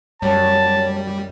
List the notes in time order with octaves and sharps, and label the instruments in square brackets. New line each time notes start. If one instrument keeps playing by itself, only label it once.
[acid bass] F#2 [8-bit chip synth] G3 [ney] C#5 [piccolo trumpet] A5